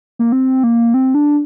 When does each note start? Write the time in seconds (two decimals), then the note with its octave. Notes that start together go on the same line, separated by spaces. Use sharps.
0.19 A#3
0.32 C4
0.64 A#3
0.94 C4
1.14 D4